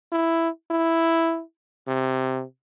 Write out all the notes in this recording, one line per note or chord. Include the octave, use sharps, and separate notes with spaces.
E4
E4
C3